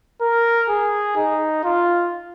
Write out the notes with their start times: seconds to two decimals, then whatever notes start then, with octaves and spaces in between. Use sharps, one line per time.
0.21 A#4
0.69 G#4
1.17 D#4
1.64 F4